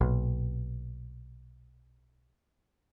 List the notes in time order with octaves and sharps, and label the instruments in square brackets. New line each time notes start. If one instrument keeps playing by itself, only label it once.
[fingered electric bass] B1 A#2